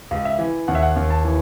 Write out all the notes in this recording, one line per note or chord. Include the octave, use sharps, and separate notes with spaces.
C#2
E5
E3
D#2 F#5
E5
F#5
D#2
A5
E3